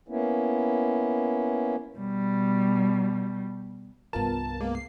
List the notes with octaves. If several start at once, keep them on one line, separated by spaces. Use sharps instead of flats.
A#3 B3 C#4 E4
B2 G3
C2 G2 B3 F4 A#4 A5
G#3 A#3 B3
C7